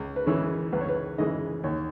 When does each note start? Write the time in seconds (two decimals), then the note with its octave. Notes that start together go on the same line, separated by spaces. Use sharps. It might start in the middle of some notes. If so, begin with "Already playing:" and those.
Already playing: C#2
0.16 B4
0.26 C#3 E3 G#3 C#5
0.72 C#2 B4
0.81 C#5
0.88 B4
1.18 C#3 E3 G#3 D#5
1.64 D#2 C#5